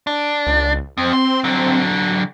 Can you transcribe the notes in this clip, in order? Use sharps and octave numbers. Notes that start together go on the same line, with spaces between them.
D4
C#2
F2 C4
C6
D3 F#3